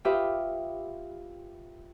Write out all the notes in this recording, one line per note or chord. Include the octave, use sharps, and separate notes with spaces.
F4 G4 B4 E5 D#6